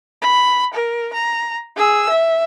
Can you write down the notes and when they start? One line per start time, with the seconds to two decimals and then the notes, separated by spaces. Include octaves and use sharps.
0.22 B5
0.73 A#4
1.13 A#5
1.76 G#4 E6
2.09 E5